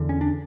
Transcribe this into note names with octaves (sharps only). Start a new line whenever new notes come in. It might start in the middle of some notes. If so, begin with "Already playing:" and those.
Already playing: E2 D3
C#4
D4